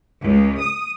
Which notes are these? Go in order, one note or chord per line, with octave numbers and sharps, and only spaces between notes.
C#2
D#6